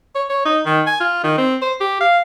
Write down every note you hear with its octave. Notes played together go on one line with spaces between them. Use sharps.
C#5
C#5
D#4
D#3
G#5
F4
D#3
C4
C5
G4
F5